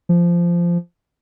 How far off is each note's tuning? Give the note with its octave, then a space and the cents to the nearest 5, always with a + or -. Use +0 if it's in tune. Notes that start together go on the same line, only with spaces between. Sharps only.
F3 -15